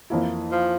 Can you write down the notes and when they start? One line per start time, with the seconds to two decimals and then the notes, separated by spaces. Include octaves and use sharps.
0.10 F2 E3 A#3 E4
0.51 F3